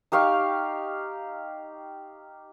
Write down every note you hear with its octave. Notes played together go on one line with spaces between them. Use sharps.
D#4 G4 F5 C#6